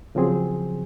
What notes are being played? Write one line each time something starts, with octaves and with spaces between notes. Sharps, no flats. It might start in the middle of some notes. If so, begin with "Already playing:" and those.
C#3 F3 F#3 C4 G#4